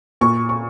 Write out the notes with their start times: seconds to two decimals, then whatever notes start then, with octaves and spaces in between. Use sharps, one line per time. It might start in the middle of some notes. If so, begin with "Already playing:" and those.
0.21 A#2 C#6
0.49 C#6